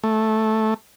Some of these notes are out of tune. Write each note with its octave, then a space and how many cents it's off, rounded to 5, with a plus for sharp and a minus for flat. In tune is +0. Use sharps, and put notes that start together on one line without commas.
A3 -5